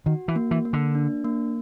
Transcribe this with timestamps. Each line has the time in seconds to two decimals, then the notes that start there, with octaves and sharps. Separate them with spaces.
0.06 D#3 F#4
0.28 E3
0.36 A#3
0.51 E3
0.65 A#3
0.73 D3
0.95 D4
1.25 A#3